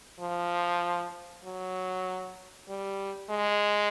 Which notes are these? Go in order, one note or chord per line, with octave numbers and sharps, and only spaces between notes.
F3
F#3
G3
G#3